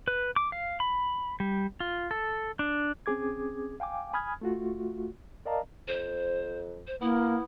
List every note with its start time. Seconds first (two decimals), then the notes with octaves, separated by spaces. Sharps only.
0.08 B4
0.36 D6
0.52 F5
0.80 B5
1.40 G3
1.80 F4
2.11 A4
2.59 D4
3.06 C4 C#4 G#4 D6 G#6
3.80 F5 G5 G#5 D6
4.13 G#5 B5 D#6 F6 G#6
4.41 A3 F4 F#4
5.46 A#4 D5 D#5 F5 A5 A#5
5.88 F2 C5
6.87 C5
7.01 A#3 B3 E4